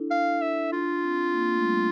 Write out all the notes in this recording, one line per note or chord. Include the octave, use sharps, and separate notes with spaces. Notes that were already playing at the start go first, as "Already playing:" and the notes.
Already playing: D4 E4 A4
F5
E5
D4 F4
C4
A#3
A3
G3